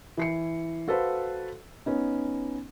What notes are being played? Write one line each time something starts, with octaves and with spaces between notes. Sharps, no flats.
E3 C7 C#7
F#4 A4 B4 C5 F5
B3 C#4 D#4